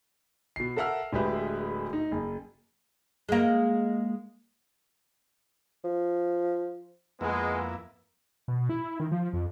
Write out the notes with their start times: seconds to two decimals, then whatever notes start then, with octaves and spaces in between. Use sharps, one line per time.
0.56 B2 C7
0.76 A4 A#4 E5 F#5 E6 F6
1.13 D1 G#3 G4 G#4 B4 E5
1.93 D#4
2.11 F#1
3.29 G#3 A#3
5.84 F3
7.21 F2 G#3 A#3 B3 E4
8.48 B2
8.69 E4
9.00 D#3
9.11 F3
9.33 F2